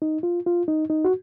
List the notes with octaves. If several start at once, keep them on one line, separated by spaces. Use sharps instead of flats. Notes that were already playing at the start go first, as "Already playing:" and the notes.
D#4
F4
F4
D#4
D#4
F#4